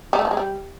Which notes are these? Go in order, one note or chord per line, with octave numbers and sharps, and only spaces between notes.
G3
A3
F3
G#3
G3